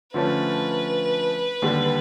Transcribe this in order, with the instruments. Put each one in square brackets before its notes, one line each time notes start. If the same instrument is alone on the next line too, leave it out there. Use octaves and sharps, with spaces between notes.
[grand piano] D3 F3 A3 C#4 [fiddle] B4
[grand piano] D#2 D3 G3